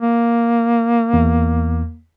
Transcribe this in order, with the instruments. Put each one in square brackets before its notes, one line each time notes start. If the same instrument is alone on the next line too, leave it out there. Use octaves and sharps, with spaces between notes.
[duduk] A#3
[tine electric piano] E2